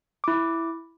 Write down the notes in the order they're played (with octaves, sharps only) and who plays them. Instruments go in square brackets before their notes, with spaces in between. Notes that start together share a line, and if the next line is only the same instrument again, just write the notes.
[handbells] E4 D6